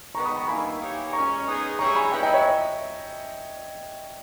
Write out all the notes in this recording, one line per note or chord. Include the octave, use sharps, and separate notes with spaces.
D#3 G#3 B3 A#5 C#6
B5 D#6
A#5 C#6
G2 D#3 A#3 E4 G#5 B5
E3 A#3 D#4 G4 C#5
A#2 G#3 C#4 A#5 C#6
G#3 B3 D#4 G#4
G3 C#4 G#4 C#5 E5 A#5 C#6
G#5 B5
G3 B3 E4 G5 A#5
D#5 G5
C#5 E5